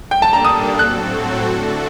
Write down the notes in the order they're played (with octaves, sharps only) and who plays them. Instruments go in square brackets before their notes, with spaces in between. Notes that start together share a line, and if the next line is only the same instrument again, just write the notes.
[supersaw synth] G3 A#3 D4 A4 [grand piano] G5
[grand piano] A5
A#5
D#6
[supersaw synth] A2 F#3 C4 F#4 A4 [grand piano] F#6
[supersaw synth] D3 A3 D4 F#4 A4